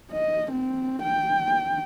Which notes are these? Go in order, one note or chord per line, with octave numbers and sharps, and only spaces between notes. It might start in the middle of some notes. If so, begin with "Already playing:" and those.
D#5
C4
G5